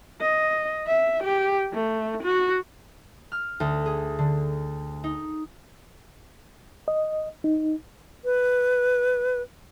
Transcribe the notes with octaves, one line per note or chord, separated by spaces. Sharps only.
D#5
E5
G4
A3
F#4
F6
D2
G#4
D3
D#4
D#5
D#4
B4